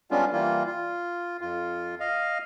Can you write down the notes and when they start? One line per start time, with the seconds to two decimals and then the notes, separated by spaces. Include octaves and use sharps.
0.11 G3 G#3 B3 C#4 D4 F4
0.32 E3 G3 A#3 F4
0.67 F4
1.41 F2 F4
2.00 D#5 F5